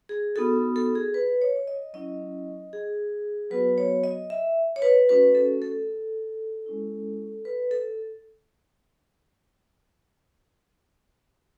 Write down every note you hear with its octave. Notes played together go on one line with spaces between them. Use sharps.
G#4
B3 D#4 F#4 A4
A4
G#4
B4
C#5
C#5
D#5
F#3 C#4 E4 D#5
G#4
F#3 B3 F#4 B4
C#5
D#5
E5
C#5
B4
A3 C#4 F#4 B4
A4
A4
G#3 C#4 E4
B4
A4